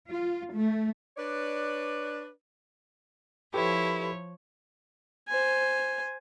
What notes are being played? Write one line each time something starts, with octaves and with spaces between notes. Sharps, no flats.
F4
A3
D4 B4 C#5 D5
F3 E4 G4 A4 B4 C#5
C5 G#5